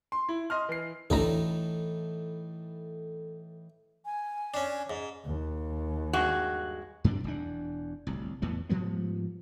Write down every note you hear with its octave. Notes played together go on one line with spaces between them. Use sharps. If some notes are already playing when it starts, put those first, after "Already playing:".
C6
E4
D#5 C6 F6
E3 C7
A1 D2 A2 E3 D#4 A4 A#5
G#5
C#4 D4
G#2
D#2
G2 G#3 F#4
F#2 C3 C#4 D4
E1 E2 D4
D1 C2
E2 A2 B3
G#2 F3 G3 B3